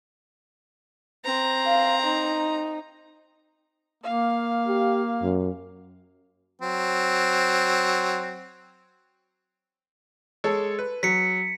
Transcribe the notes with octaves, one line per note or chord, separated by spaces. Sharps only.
C4 A#5
F5
D#4
A#3 F5
G4
F#2
F#3 C4
G#3 A4 C#5
B4
F#3 B6 C#7